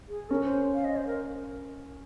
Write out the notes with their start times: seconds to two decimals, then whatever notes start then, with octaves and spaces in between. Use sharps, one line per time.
0.08 G#4
0.30 C#4 A#4
0.44 C5
0.74 F5
0.84 D#5
0.96 C5
1.07 A#4